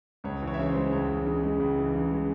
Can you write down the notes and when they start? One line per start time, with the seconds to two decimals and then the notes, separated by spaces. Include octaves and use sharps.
0.24 C#2 C#5
0.42 E3
0.47 C#5
0.54 E5
0.59 C#3 C#5
0.69 C5
0.75 G#3
0.92 C#2 C#5
1.09 E3
1.26 C#3
1.44 G#3
1.60 C#2
1.77 E3
1.94 C#3
2.11 G#3